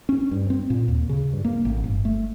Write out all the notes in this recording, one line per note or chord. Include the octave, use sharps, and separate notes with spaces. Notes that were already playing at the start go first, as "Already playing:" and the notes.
C#4
G2
C4
A#2
D#2
C#3
G2
A#3
A1
G1
A3